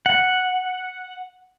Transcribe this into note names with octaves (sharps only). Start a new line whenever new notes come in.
F#5